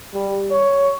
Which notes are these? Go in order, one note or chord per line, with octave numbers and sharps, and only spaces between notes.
G3
C#5